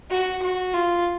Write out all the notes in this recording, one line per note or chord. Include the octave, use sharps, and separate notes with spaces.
F#4
F#4
F4